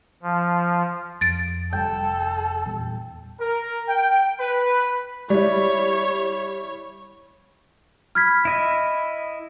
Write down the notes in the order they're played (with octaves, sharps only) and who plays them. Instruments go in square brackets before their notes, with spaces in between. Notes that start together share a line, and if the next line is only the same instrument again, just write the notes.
[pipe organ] F3
[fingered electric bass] F2 [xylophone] A6 D7
[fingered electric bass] F1 G3 [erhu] A4 [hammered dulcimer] G5
[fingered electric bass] E2 A#2 G3
[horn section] A#4
G5
B4
[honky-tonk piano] G3 E4 [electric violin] C#5
[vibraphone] B5 [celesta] F6 G#6 B6
[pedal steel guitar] E4 D#5 E5